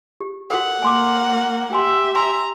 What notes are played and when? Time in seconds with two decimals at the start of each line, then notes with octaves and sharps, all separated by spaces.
0.21 G4
0.50 F#4 A4 A#4 F#5
0.83 A#3 G#5 C6 D6
1.73 G4 E5 G#5 C6
2.15 G#5 A#5 C6